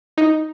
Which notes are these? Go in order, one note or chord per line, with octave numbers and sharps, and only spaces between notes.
D#4